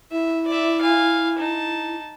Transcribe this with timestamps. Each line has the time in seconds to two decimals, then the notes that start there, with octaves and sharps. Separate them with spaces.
0.12 E4 E5
0.48 D5 E5
0.81 F5 G#5
1.38 D#4 A5